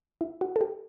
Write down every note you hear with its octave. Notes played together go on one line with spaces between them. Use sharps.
E4
F#4
A4
G4